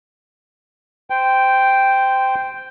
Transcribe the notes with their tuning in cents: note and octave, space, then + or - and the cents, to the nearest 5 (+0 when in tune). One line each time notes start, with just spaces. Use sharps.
C5 -15 G5 +0